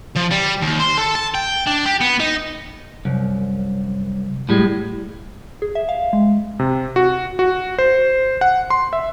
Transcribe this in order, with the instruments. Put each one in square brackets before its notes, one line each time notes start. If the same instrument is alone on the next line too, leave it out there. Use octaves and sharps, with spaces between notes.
[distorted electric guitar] F3
G3
D#2
C5
A4
A5
G5
D4
G4
B3
D#4
[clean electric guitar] C2 F#2
A2 G3 G#3
[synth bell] G#4
E5
F5
G#3
[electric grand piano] C3
F#4
F#4
C5
F#5
C6
E5